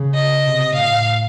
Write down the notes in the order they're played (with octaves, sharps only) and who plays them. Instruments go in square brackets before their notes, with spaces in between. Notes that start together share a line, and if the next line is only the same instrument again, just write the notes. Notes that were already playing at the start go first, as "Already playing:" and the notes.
Already playing: [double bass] C#3
[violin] D#5
[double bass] C3
[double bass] A2 [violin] F5